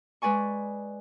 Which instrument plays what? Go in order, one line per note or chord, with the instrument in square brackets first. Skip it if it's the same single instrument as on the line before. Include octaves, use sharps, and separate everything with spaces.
[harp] G#3 B4 D5 G#5 C#6